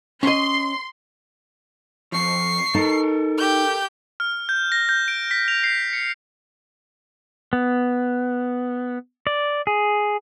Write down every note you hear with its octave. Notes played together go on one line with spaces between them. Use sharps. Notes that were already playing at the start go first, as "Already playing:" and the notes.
C#4 D#5 C6
F2 F3 C#6 C7
D#4 A4 A#4
G4 G6
F6
G6
A#6
G6
D7
B6
F7
C7
C#7
B3
D5
G#4